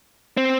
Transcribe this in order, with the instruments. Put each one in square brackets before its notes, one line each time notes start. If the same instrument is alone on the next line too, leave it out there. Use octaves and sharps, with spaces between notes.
[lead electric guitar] C4